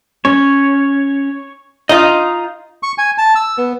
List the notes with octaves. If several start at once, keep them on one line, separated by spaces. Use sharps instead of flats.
C#4 C#5
D#4 F4 D#5
C#6
G#5
A5
E6
B3